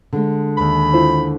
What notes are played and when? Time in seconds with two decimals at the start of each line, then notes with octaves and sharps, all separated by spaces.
0.13 D3 G#3
0.57 D#2 B5
0.93 E4 F4 C5